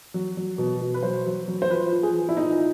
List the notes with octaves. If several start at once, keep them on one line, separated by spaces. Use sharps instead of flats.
F#3
F#3
B2
B2
B4
F#3 C5
F#3
F#3
C5
F3 B4
F3
G#4
F3
E4
A#2 D#4